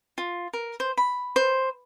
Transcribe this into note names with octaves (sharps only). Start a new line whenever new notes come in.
F4
A#4
C5
B5
C5